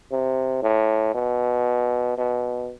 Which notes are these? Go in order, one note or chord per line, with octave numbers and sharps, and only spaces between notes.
C3
A2
B2
B2